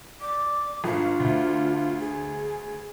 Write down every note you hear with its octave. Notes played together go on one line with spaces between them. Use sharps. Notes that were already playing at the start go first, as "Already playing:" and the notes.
D5 D6
G#1 D4 F4
D2
G#4